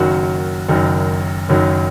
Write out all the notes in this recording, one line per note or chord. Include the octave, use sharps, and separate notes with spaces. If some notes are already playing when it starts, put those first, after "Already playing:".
Already playing: F#1 F#2 D#3 F#3 F#4
F#1 F#2 D#3 F#3
F#1 F#2 D#3 F#3